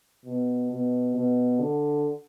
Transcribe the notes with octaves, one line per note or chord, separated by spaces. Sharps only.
B2
B2
B2
D3